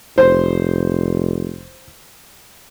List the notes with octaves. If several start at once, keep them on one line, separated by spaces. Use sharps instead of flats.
F1 C5